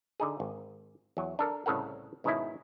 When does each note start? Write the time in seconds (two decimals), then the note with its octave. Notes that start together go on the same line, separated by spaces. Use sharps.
0.20 D3 D#4 G#4
0.40 G#1
1.17 E2 F#3
1.39 D4 A4 A#4
1.66 C2 A2 C#3 A4 A#4 F#5
2.24 G#2 B2 D#3 C#4 D#4 E4